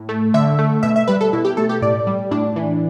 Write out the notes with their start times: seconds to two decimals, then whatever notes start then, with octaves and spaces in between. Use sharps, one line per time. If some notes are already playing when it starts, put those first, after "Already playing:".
Already playing: A2
0.09 A3
0.34 D3 E5
0.59 A3
0.83 B2 E5
0.96 E5
1.08 G3 B4
1.21 A4
1.33 B2 E4
1.45 G4
1.57 A3 A4
1.69 G4
1.82 A2 D5
2.07 G3
2.31 A2 D4
2.56 E3